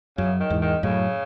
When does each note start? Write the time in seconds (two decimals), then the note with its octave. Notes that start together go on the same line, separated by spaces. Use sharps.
0.17 F#2 C#3
0.40 D#3
0.50 E2 G#2
0.61 D#3
0.83 F#2 A2 C#3